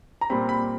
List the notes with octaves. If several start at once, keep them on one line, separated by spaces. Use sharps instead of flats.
A#5
A#2 G3 C4 B5
B5